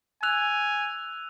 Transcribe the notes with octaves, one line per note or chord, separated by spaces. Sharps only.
G#5 E6 F#6 F7